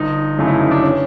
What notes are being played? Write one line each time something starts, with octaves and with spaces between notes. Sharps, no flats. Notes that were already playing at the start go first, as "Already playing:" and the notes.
Already playing: G1 D#4
F#2 C#3 E3 A3
E4
D#4
D4
C#4